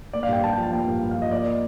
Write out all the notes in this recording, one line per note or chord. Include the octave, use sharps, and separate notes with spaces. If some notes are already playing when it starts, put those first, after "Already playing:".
A#3 D5
F5
G2 G5
G2 A5
G5
F3
A5
A#3 G5
G2
G2
F5
F3
D#5
A#3 D5
D#5